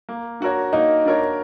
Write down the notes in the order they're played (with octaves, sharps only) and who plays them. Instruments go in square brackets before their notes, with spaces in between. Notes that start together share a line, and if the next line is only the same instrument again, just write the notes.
[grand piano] A#3
D4 F#4 A#4 C#5
[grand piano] A#3 [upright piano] D#4
[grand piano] D4 F#4 A#4 C#5